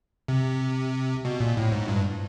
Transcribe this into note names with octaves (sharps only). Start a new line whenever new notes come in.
C3
B2
A#2
A2
G#2
G2